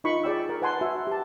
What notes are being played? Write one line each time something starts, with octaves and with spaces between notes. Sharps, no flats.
D#4 F4 A#4 B5 C#6
G#4 D5 G5 E6
A#4
B4 F#5 G#5 A5 C6
F#4 E5
G4 A5